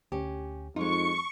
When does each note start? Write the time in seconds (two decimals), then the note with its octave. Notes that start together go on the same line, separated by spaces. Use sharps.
0.12 D2 C#4 G4
0.76 F2 G#3 D#4 F4 C#6